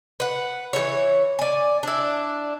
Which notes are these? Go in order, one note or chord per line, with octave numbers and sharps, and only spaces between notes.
B4 F#5
E3 G3 E4 C#5
D5 G#5
D4 E4